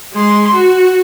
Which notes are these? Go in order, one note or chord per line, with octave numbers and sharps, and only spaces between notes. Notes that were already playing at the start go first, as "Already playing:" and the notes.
G#3 C6
F#4